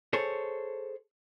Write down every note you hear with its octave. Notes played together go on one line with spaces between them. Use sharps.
G#4 A4 C5 C#5